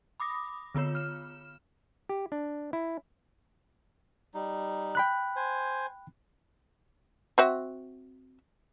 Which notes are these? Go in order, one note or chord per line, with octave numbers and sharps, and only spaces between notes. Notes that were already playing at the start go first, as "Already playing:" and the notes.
B5 D6 D#6 A#6
D3 B3 F4 C#5 E7
F6 E7
G4
D4
E4
G3 D#4
G5 B5 F#6
C5 G#5
C4 F#4 E5